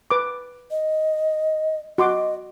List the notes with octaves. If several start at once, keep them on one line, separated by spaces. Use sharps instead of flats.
B4 D6
D#5
F#4 D#5 C6 D6